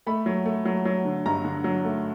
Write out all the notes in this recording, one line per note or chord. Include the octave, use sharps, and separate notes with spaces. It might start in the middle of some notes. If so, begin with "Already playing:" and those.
A3 B5
F#3
A3
F#3
F#3
D3
G2 A#5
D3
F#3
A3